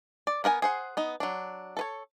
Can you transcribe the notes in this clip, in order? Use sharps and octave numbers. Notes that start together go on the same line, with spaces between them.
D5
B3 A#4 F#5 G#5
G#4 C5 F#5
B3 D#4
F#3 D4
A4 B4 C#5